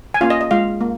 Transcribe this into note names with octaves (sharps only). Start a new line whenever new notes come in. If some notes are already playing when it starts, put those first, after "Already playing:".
G#5
A#3 C#4 F4 F5
D#5
D#5
G#3 F4 F5
A#3